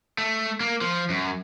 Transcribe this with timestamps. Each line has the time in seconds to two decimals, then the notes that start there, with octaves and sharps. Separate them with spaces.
0.18 A3
0.60 A#3
0.81 F3
1.10 F#2